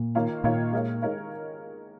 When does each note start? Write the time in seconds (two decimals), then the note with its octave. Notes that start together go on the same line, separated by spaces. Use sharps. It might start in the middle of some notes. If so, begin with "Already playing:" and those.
Already playing: A#2
0.15 D#3 A#3 F4 C#5 F5
0.44 A#2 D#3 A#3 F4 C#5 F5
0.73 G#3 D#4 A#4 C#5 F5
1.02 G#3 D#4 A#4 C#5 F5